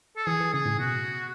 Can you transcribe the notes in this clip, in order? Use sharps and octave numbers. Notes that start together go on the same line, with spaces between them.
A4
E3 G#4
E3
C#3 G#4
A2
B2 F#4